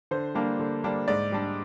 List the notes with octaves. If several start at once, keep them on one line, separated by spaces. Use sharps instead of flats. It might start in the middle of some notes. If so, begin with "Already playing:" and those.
D3 C5
G3 A#3 D4
D3
G3 A#3 D4
G#2 D5
G3 D4